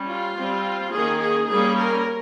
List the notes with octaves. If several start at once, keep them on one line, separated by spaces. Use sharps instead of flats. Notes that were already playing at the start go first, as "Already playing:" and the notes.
Already playing: G3 C#4
F4
G3 C4
D#3 A#3 C#4 G#4
G#4
G3 A#3 C#4 G#4
A#4